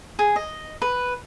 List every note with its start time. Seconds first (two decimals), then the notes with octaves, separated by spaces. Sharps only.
0.19 G#4
0.36 D#5
0.82 B4